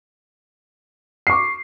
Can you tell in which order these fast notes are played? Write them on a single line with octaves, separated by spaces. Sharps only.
C7 C#6 D6